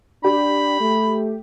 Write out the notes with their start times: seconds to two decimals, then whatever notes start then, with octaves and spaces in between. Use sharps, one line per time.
0.24 D4 G4 B5
0.80 A3